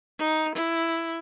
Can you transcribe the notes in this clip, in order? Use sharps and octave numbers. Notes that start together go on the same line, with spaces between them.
D#4
E4